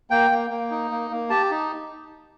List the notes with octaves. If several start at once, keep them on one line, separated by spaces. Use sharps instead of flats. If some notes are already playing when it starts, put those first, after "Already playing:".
A#3 G5
A#3
A#3
D#4
A#3
A#3
G4 A5
D#4